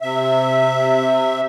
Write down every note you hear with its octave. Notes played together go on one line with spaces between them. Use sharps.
C3 E5